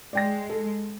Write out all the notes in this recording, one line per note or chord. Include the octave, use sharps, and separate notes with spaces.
G#3 D5 G5 A#6
A4